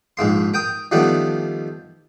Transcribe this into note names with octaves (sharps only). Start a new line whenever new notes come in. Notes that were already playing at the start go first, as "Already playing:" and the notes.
A#1 G#2 A#3 C6
A#4 G5 D#6
D#3 F3 G3 A3 B3 D4